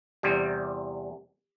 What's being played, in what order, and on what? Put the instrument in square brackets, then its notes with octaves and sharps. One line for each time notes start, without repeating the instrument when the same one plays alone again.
[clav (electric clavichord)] E2 C3 G3